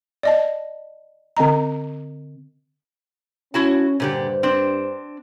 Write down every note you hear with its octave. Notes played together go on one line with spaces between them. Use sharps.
D5 D#5 A5
D3 C4 D#5 A#5
C#4 E4 F#4 A5
G2 A#2 D3 G4 C5
C4 D4